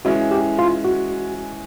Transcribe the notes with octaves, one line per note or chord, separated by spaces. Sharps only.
E3 G#3 C#4 E4 F#4
G4
F4
F#4